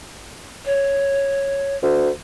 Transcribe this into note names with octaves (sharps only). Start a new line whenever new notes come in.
C#5
D2